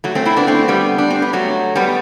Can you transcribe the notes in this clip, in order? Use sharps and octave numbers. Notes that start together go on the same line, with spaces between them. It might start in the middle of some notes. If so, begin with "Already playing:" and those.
F#3 A3
A3 C4
C4 E4
B3 D4
A3 C4
G3 B3
D4
C4
B3
F#3 A3
G3 B3